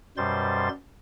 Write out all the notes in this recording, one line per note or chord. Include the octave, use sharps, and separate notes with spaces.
F#2 B2 G3 C5 C6 A6